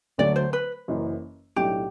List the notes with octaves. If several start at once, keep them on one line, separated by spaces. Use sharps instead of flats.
D2 D3 F#3 A3 D5
C5
B4
F#1 F#2 E3
B1 A2 F#3 A3 D4 G4